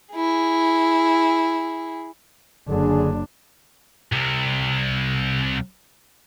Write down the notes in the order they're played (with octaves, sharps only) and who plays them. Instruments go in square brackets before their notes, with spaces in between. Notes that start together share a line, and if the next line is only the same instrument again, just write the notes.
[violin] E4 G#4
[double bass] F#1 D4 [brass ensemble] D3 G#4
[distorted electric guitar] C2 C3